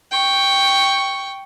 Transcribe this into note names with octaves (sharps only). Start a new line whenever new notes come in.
G5 C#6